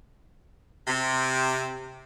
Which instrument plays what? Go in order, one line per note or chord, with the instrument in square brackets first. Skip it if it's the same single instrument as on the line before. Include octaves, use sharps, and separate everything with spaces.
[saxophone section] C3